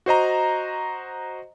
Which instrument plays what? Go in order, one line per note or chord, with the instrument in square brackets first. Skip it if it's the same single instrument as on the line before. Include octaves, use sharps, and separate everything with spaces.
[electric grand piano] F#4 C5 D#5 A#5